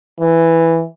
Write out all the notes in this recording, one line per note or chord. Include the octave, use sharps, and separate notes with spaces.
E3